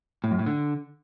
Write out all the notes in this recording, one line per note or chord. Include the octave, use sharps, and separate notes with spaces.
A2
F#2
A2
D3